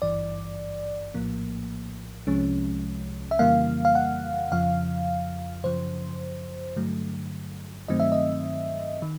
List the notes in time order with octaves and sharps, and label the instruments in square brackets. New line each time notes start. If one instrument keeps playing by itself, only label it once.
[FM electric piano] G#1 G2 E3 D5
A#1 A2 F3 A#3
C2 C3 F3 G#3 C#4
E5
F2 C#3 E3 G3 A#3 F5
F5
F#5
F2 C#3 F3 F5
F#2 C#3 F3 C5
G2 D3 F#3 A3
G2 D#3 F#3 A3 C4 D#5
E5
D#5
D#3